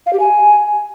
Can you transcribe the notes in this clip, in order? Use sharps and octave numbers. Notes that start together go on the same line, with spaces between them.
F5
G4
G#5